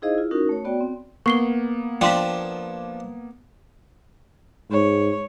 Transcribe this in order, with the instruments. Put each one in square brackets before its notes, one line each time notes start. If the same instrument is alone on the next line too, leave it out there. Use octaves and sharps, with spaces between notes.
[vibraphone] D#4 E4 G#4 C5 D#5 F5
E4 F4
C#4 D#4 F#4 A#4
A3 C#5
B3 F#4 D5 G5
C4
[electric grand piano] A#3 B3 [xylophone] C#6 C7 G7
[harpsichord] F3 D4 [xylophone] G5 C6 B6
[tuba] G#2 [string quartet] C#5